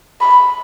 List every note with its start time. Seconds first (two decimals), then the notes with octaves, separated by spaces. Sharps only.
0.21 B5